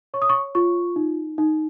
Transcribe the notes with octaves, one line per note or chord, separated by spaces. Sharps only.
C#5 C#6
D#6
C#6
F4 C#6
D#4
D#4